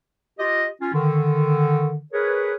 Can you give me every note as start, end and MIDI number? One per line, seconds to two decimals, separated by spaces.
0.39 0.66 65
0.39 0.66 67
0.39 0.66 75
0.82 0.90 61
0.82 0.90 65
0.94 2.01 50
0.94 2.01 51
2.13 2.55 68
2.13 2.55 70
2.13 2.55 71
2.13 2.55 73